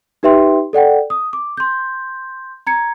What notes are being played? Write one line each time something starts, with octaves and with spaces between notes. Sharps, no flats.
D#4 G4 B4 E5 G5 C6
A4 D5 F#5 G5
D#6
D6
C6 G6
A#5 G#6 C#7